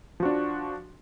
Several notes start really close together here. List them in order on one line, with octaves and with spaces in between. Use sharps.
F3 F#4 D4